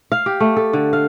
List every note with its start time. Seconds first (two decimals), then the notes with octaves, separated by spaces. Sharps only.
0.12 F5
0.26 G4
0.40 A3
0.57 A4
0.73 D3
0.93 F5